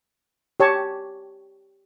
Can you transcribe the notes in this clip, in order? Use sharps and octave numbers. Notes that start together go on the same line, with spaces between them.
G4 C#5 A5